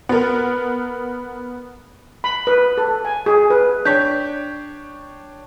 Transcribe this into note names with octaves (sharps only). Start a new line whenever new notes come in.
B3 A#4
B5
B4
A4
G#5
G#4
B4
D4 C#5 G5 G6 B6